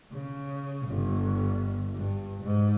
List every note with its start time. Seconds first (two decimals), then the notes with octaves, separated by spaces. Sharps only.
0.11 C#3
0.87 G1
1.94 G2
2.43 G#2